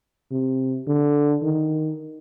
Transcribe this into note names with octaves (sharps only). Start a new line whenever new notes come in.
C3
D3
D#3